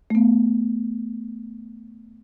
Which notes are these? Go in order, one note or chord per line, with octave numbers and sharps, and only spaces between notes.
A3 B3